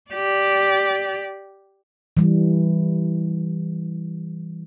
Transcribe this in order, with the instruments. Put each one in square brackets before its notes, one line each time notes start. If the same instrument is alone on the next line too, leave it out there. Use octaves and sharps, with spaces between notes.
[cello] G4 D5
[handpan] E3 G3